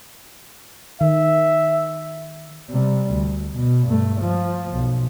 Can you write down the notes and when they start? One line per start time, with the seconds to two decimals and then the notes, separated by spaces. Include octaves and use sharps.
1.01 D#3 E5
2.70 C3 G3
3.12 D2
3.56 B2
3.88 G2 A3
4.21 F3
4.72 B1